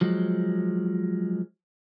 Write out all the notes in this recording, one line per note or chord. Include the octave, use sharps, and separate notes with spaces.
F3 F#3 G#3